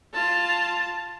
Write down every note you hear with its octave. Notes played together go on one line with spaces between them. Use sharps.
F4 A5